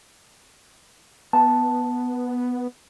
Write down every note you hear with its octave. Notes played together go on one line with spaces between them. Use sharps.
B3 A5